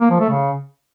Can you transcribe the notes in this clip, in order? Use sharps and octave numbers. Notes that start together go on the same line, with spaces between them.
A#3
F3
A3
C#3